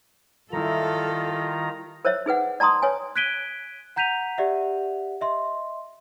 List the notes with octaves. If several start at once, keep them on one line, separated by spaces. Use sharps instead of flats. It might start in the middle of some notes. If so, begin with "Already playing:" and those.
D#3 G3 E4 F4 A4 A#5
A#4 C5 C#5 E5
D#4 G#4 B4 F#5
D5 A5 A#5 C6 D#6
B4 C#5 G#5
F#6 G#6 B6 D7 D#7 G7
F#5 A#5 G6 B6 D#7 F7
G4 D5 E5 F#5
D#5 E5 C6